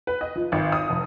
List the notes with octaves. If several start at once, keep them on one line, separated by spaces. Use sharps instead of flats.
B4
D#5
F3
G#1
D#6
F1